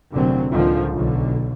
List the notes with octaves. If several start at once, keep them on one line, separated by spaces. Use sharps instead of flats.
F1 A#2 D3 F#3 C4
C#2 A2 D3 D#3 F3
B1 D3